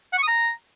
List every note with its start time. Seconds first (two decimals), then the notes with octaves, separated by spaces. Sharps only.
0.13 F#5
0.18 C#6
0.23 D#6
0.28 A#5